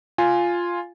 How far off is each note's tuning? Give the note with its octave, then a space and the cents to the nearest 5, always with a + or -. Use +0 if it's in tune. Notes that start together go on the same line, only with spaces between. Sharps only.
F4 +0 G#5 +0